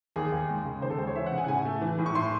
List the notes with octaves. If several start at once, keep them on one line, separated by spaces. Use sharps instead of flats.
D#2 G#4
D#2
G#3
C#3
D#2 C5
A4
G#3 C5
C#5
E3 E5
F#5
C#3
G#5
F#5
A2 G#5
A3
E3
A2
C#6
A2 C6